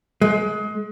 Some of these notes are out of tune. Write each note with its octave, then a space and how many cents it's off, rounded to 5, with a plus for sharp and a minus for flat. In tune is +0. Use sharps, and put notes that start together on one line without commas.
G#3 +30